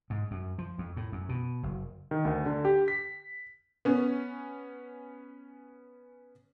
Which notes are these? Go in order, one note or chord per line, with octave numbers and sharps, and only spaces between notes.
G#2
F#2
F3
F2
A2
F#2
B2
F#1
D#3
D2
D3
G4
B6
B3 C#4